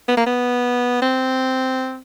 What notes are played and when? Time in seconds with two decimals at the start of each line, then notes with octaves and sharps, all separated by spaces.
0.08 B3
0.17 A#3
0.26 B3
1.02 C4